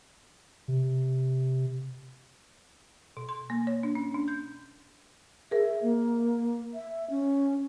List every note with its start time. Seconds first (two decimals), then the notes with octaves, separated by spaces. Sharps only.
0.68 C3
3.17 B2
3.29 C6
3.50 A#3
3.67 C#5
3.83 D4
3.95 C#4
4.14 D4
4.28 G6
5.51 G#4 A#4 E5
5.82 A#3
6.74 E5
7.10 C#4